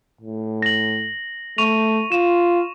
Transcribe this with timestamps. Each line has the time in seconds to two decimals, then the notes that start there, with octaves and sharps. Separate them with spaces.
0.21 A2
0.62 A#6 F#7
1.58 A3 C#6 D#7 F7
2.12 F4 E7